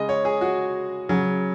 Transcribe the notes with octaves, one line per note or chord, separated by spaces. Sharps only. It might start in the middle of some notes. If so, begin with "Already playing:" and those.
Already playing: C#3 G#3 D#5
C#5
G#4
F#4
C#3 F#3